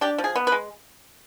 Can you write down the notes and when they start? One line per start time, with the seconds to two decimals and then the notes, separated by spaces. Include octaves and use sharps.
0.01 D4 G4
0.18 F3
0.24 G#4
0.36 B3
0.47 B4
0.52 G#3